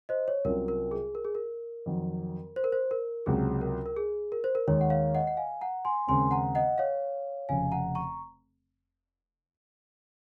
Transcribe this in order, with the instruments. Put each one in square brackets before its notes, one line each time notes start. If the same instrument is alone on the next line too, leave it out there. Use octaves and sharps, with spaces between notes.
[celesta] C5 D#5
C#5
[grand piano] C2 C3 F#3 C#4 F4 [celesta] A#4
[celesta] A#4
G#4
A#4
G#4
A#4
[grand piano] F2 D#3 F#3
[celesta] C5
A#4
C5
A#4
[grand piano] C#2 C3 F#3 [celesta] G#4
[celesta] A#4
A#4
G#4
A#4
C5
A#4
[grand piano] D#2 D#3 G#3 [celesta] C#5
[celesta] F#5
C#5 F5
D#5 F#5
F#5
F5 G#5
F#5 A#5
G#5 C6
[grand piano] D#2 C#3 G#3 C4 [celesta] G#5 C6
[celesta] F#5 A#5
D#5 F#5
C#5 F5
[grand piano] F1 F2 C#3 [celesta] F5 G#5
[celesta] F#5 A#5
A#5 C#6